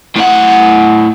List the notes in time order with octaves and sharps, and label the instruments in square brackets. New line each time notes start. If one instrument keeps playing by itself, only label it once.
[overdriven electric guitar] A2 F#5